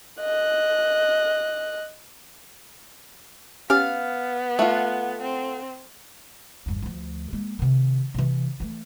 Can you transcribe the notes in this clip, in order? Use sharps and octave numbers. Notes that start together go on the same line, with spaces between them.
D#5 F#6
B3 C#4 G4 F5 F6 A6
A3 F4 F#5
C4
G1 E2
D2 F3
G#3 A#3
C3 D#3
C3 E3
E3 A3